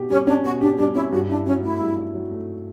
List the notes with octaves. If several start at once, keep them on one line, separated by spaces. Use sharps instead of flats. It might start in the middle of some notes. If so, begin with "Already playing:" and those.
Already playing: B2 G4
G3 C#4
C#4 D4
B2 F#4
D4 G4
G3 D4
C#4 E4
G2 F#4
D4 E4
F#3 C#4
A3 E4
G2
E4
F#3
A3